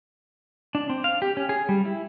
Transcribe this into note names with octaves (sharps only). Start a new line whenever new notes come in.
D4
C4
F5
G4
C#4
G#4
G3
E4